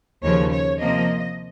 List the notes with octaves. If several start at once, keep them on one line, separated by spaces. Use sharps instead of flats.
D#2 C#3 F3 C#5
C#5
C3 F3 A#3 D#5